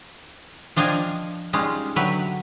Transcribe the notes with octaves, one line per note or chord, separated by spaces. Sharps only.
F3 D4 D#5 F5 G5 G#5
G3 G#3 C#4 D#4 F4
D3 F#3 B4 E5 G5